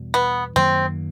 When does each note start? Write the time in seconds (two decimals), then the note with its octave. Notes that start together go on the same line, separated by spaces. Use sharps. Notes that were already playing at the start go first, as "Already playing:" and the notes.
Already playing: E2 B2 G3
0.14 B3
0.56 F#2 D#3 F#3 A#3 C4